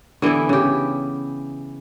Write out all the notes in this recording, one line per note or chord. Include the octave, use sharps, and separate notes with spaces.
D3 E3 B3 E4
C#3 G4